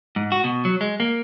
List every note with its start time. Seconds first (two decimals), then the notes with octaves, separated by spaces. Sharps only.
0.16 G#2
0.32 F#4
0.44 B2
0.65 F#3
0.81 G#3
1.00 A#3